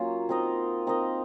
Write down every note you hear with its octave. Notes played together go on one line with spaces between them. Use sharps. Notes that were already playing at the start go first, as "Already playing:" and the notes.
Already playing: F#3 A#3 C#4 F4
C4 D#4 A#4 D#5
C4 D#4 A#4 D#5